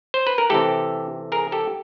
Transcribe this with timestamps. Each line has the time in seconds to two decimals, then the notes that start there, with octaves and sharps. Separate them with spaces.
0.14 C5
0.27 B4
0.38 A#4
0.50 C3 E3 A3 G4 A4
1.32 G#4 A#4
1.52 G4 A4